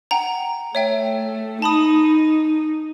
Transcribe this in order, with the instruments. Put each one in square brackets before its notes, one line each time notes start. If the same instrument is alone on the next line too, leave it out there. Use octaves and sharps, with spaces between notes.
[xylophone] F#5 G5 A#5
[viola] A3 [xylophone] C#5 E5 G5
[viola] D#4 [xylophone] A5 B5 D#6